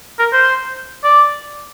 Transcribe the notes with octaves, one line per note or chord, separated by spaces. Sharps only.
A#4
C5
D5